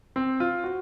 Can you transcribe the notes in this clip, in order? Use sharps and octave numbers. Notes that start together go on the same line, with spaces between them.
C4
F4
F#4